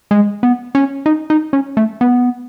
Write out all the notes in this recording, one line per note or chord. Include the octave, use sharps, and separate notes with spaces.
G#3
B3
C#4
D#4
D#4
C#4
A3
B3